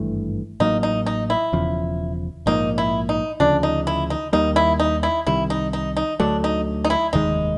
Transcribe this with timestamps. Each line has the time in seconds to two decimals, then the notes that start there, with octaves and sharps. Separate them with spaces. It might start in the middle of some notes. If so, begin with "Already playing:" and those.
Already playing: G#1 G2 E3 A3
0.60 A1 A2 F#3 A#3 D#4
0.83 D#4
1.06 D#4
1.30 E4
1.53 E1 E2 C#3 F3
2.46 A#1 G#2 F3 A#3 D#4
2.78 E4
3.09 D#4
3.40 D2 C#3 F3 D4
3.63 D#4
3.87 E4
4.10 D#4
4.33 D#2 D#3 G3 A#3 D#4
4.56 E4
4.80 D#4
5.03 E4
5.27 C2 C3 D#3 G3 E4
5.50 D#4
5.73 D#4
5.97 D#4
6.20 D2 D3 F#3 A3 D4
6.44 D#4
6.85 D#4
6.90 E4
7.13 F1 D#2 D#3 G#3 D#4